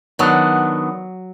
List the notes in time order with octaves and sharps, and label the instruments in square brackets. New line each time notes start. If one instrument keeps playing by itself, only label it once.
[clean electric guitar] D#3 B3 D4 [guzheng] F#3